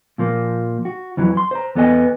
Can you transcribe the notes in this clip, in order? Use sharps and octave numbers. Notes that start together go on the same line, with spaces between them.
A#2 F3 A#3
F#4
F2 E3 F#3
C6
C5 A#5
E2 B3 A4 D#5 G#5